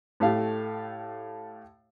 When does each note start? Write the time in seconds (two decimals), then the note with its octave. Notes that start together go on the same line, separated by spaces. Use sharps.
0.20 A2 A3 G4 F5